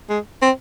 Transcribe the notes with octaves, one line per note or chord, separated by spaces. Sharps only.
G#3
C4